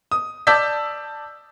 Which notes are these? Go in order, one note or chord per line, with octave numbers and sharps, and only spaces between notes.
D#6
D5 A5 E6 G6 B6